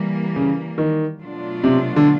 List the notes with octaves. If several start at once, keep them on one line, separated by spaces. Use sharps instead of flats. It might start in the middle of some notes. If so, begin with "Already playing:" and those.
Already playing: E3 G3 A#3
C#3
D#3
B2 F#3 A3 D4 F4
C3
D3